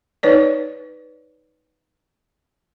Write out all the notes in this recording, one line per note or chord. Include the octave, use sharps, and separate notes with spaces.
D#4 B4 C#5 D5